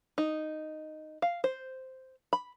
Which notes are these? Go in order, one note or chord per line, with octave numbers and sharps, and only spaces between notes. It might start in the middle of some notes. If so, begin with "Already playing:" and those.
D#4
F5
C5
B5